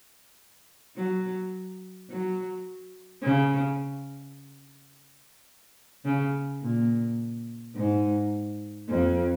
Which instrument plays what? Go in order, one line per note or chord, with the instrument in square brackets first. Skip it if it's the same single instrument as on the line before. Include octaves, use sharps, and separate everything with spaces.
[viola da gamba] F#3
F#3
C#3
C#3
A#2
G#2
F2